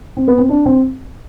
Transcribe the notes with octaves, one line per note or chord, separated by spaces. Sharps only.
C4
B3
C4
D4
C4